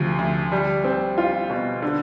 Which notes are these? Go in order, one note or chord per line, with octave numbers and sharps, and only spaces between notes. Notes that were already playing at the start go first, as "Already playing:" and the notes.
Already playing: D2 C3 F3
D2
G3
C4
F4
B2
D3